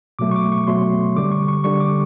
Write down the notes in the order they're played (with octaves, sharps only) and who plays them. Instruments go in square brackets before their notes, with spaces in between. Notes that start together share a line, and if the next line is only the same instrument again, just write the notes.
[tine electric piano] B2 F#3 A3 D6
C#6
D6
C#6
B2 F#3 A3 C6
D3 G3 D6
C#6
C#6
D3 G3 C#6
D6